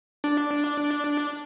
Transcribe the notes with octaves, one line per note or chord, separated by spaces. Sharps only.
D4